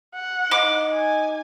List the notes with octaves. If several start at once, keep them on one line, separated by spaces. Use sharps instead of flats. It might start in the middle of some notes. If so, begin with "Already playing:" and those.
F#5
D#4 D6
G#5